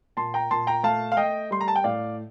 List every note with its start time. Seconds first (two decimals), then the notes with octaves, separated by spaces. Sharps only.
0.17 A#2 A5 C6
0.34 G5 A#5
0.51 A#2 A5 C6
0.67 G5 A#5
0.83 A3 F5 A5
1.12 F5
1.17 A3 D#5 G5
1.51 G3 C6
1.61 A#5
1.68 A5
1.76 G5
1.84 A2 D5 F5